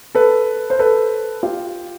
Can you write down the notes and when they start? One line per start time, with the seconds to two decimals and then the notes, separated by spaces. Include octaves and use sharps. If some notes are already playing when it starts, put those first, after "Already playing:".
0.15 A4 B4
0.70 C5
0.79 A4 B4
1.43 F4 G4